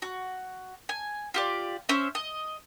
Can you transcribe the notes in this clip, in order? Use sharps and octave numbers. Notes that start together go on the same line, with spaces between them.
F#4
G#5
F4 G4 D5
C#4 C5 E5
D#5